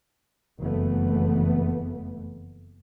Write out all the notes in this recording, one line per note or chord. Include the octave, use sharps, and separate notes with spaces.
F#1 F2 E3 A3 B3